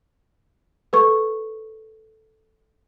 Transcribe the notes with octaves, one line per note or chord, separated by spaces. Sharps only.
A4 B4 C#6